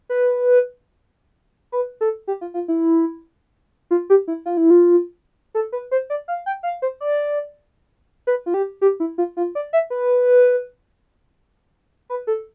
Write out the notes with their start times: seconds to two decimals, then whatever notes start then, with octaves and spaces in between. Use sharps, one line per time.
0.09 B4
1.72 B4
2.01 A4
2.27 G4
2.41 F4
2.54 F4
2.68 E4
3.91 F4
4.10 G4
4.28 E4
4.46 F4
4.57 E4
4.70 F4
5.55 A4
5.72 B4
5.91 C5
6.10 D5
6.28 F5
6.46 G5
6.63 F5
6.82 C5
7.00 D5
8.27 B4
8.46 F4
8.54 G4
8.81 G4
9.00 E4
9.18 F4
9.37 F4
9.55 D5
9.73 E5
9.90 B4
12.10 B4
12.27 A4